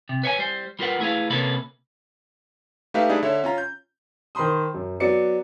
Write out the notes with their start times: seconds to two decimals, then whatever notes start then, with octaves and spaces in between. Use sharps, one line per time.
0.09 C3
0.23 B4 C#5 E5 G#5
0.39 G3 C5
0.79 G3 F4 A#4 B4 F#5
1.00 A3 E4 G#4 B4 F5
1.30 C3 A#3 C#4 A4 B4
2.94 A3 D#4 G4 B4 E5 F5
3.09 G3 A3 D4 D#4 G#4
3.23 D3 C#5 E5
3.44 C#4 F4 A#5
3.58 G6
4.35 D#3 C5 B5 C6 D#6
4.74 F#2
5.00 F#3 B3 D5 C#7